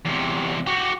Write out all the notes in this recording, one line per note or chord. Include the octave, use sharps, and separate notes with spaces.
E2 C3
F#4 G4